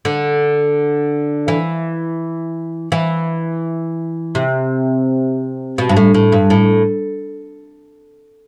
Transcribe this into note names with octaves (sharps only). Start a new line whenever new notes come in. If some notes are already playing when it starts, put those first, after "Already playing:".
D3
E3
E3
C3
B2
G2
A2
A2
G2
A2